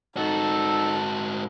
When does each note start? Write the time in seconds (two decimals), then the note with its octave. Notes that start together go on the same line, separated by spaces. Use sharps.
0.17 G#2 D#4 F#4 A4 A5